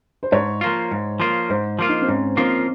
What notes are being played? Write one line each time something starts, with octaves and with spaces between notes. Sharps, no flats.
C5
G#2 C#5
F3 A#3 F4
G#2
F3 A#3 F4
G#2 C5
F3 A#3 F4
D#4
C4
G#2 C#4
F3 A#3 C4 F4